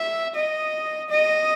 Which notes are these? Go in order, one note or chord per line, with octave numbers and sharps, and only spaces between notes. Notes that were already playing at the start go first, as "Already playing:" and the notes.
Already playing: E5
D#5
D#5